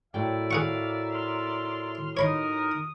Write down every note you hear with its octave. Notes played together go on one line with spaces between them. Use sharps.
A2 F#3 A#4 D5 E5 G5
G#4 F5 F#5 C#6
C6 F6
D#4 A#4 C#5 B5 C6 D#6